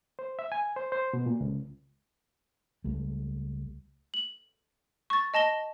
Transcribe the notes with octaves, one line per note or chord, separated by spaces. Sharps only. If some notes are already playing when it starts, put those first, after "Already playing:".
C5
E5
G#5
C5
C5
B2
A#2
C#2
C#2 G3 A3
F#7
C#6 A6
D#5 A5 A#6 G7